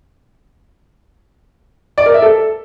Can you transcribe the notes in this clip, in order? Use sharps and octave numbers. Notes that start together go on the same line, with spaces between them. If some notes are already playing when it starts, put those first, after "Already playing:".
D5
A#4
E5
A4